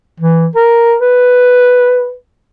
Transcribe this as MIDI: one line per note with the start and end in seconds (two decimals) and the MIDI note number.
0.20 0.48 52
0.55 0.95 70
1.00 2.13 71